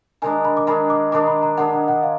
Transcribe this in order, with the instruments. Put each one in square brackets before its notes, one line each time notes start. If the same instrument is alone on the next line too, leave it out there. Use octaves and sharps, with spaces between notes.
[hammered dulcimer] D#3 G#3 D4 [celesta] G#5
[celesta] B5
D6
[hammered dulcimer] D#3 G#3 D4 [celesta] B5
[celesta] D6
[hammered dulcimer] D#3 G#3 D4 [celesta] D6
[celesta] B5
A#5
[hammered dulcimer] D#3 G#3 D4 [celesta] F#5
[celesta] F#5
F#5
F5